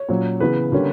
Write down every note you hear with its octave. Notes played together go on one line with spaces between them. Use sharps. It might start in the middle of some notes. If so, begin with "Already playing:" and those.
Already playing: C#5
A#2 F#3 C#4
C#3 E3 B3 B4
D3 G3 A#3 C#4